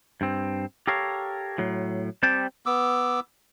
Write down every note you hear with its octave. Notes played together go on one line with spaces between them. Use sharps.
G2 C4
G4 A4 A#4 C#5 F5
A2 F#3
G3 C4 G4 G5 A5
B3 D6 E6